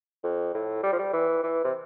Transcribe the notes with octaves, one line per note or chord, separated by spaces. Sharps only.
F2
A2
G3
F3
G3
E3
E3
C3